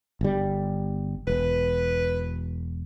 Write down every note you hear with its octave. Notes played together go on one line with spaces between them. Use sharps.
G1 G3
E1 B4